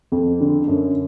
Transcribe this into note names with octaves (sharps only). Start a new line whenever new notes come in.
F2
D3
F#2